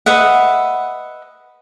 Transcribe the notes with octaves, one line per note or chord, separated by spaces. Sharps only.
B4 D#5 E5 F#5